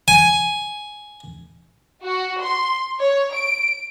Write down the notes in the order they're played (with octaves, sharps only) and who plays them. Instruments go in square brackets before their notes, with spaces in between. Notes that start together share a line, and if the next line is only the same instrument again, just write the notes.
[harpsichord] G#5
[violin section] F#4
C6
C#5
D7